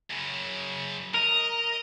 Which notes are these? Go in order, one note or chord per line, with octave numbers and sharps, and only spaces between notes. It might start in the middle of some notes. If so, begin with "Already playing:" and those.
F#2 C#3
A#4 D#5